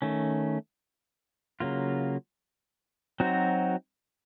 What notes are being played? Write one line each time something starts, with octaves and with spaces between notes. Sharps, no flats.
D#3 A3 C#4
C#3 F#3 A#3 F4
F#3 C4 D#4 F#4 C5